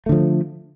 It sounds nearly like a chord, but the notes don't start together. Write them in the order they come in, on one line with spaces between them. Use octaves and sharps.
A3 D3 F3